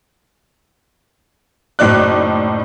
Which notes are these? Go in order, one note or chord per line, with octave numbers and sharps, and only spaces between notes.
F#1 A2 D#4 D5 F#6